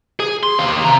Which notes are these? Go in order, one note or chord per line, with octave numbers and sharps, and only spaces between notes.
G#4
C6
D#2 F5
C3 A#5